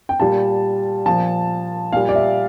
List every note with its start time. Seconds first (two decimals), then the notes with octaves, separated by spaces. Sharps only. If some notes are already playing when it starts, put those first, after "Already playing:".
0.09 G5
0.20 A#2 G3 A5
1.06 A#2 F3 A5
1.93 A#2 G3 F5
2.09 D5
2.15 E5